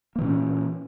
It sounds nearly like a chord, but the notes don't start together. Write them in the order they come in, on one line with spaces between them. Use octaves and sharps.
A#3 E3 A#2 C#4